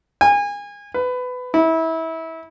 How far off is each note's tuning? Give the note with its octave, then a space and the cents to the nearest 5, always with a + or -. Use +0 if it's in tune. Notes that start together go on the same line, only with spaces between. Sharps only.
G#5 -30
B4 +20
E4 -25